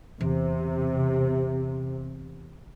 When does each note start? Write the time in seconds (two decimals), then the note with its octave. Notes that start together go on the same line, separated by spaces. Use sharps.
0.21 E2 C3